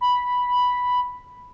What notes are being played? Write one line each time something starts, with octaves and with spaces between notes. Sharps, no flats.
B5